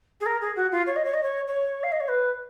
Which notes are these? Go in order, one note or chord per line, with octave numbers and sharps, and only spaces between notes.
G#4
A#4
G#4
F#4
F4
C#5
D#5
C#5
D#5
C#5
C#5
F5
D#5
C#5
B4